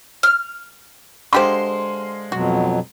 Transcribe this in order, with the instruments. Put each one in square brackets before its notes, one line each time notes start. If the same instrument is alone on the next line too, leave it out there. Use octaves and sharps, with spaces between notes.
[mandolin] F6
[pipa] D3 G4 C5 [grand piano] G#3 F5 C6
[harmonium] F2 B2 F#3 [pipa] F#4